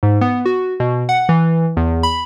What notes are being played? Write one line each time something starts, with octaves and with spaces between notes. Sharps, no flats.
G#2
B3
F#4
B2
F#5
E3
E2
B5